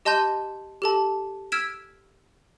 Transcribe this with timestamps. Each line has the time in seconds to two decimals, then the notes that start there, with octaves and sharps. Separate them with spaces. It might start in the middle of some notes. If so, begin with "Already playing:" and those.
0.05 G4 D#5 A5 C6 G6 D#7
0.82 G4 A4 A5
1.52 E6 F6 G#6 B6 D7 E7